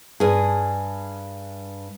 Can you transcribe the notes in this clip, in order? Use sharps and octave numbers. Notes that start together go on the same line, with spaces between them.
G2 G#4